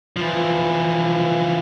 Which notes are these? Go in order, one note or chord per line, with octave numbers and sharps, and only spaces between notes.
E3 F3